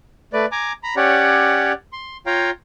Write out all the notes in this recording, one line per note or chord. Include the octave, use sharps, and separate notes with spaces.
A3 B4 D5
G#5 A#5 D6
A#5 B5
C#4 G4 C#5 D5 F#5
C6
F4 C#5 F5 G5 A#5